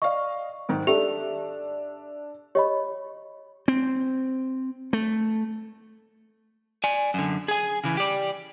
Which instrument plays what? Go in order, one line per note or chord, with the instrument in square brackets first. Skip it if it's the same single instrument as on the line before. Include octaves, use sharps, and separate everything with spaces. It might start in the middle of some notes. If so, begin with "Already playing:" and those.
[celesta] D5 C#6 [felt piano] D#5 F5
[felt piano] G#2 D#3
[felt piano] D4 E5 [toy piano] G4 A4 [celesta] F7
[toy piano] G4 [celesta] C#5 D#5 B5
[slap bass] C4
A3
[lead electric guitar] D5 G#5
F#2 D3
G#4 G#5
C#3 E3
G4 D5